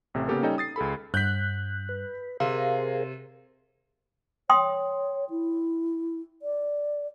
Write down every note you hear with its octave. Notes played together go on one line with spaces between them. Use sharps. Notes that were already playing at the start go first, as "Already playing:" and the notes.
A1 C3 A3
C#3 A#3 B3 G4 A4 A#4
G3 C#4 D#4 A4 D#5 G5
D#6 A6 C7
C#2 G#4 A4 B5
G2 F#6 G6 B6
B4
C3 G#4 A#4 C5 F5
C#5 G5 C6 D#6
E4
D5